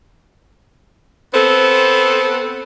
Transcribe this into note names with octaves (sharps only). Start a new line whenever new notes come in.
B3 C4 A4